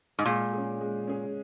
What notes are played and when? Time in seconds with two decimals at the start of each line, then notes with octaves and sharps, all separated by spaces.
0.19 G#2
0.25 A#2 G#3
0.53 C#4 G#4
0.81 G#3
1.07 C#4 G#4